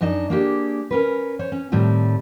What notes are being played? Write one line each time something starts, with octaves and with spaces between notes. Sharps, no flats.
F#2 D4 D#4 D#5 A5
A#3 D4 G4 G#4
C#4 A#4 B4
C5 C#5
C#4
A2 D#3 G3 A3 C4